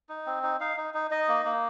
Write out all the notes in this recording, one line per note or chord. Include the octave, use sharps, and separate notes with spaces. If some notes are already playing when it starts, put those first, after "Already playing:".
D#4
C4
D#4
D#4 F5
D#4
D#4
D#4 D#5
A#3
A#3